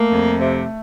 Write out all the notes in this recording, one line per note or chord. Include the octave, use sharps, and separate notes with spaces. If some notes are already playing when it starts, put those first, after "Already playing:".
Already playing: A3 A#3
F2
C3